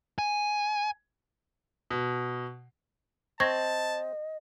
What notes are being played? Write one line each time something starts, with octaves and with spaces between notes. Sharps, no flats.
G#5
B2
C4 D#5 A5 C#6 G#6 A#6